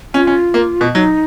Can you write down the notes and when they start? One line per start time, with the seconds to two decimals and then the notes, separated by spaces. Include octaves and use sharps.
0.14 C#4 F4
0.27 C#4
0.54 A#3
0.81 B2
0.95 F#3 D#4